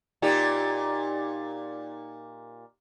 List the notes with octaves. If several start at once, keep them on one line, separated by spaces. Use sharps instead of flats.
A#2 D#4 G4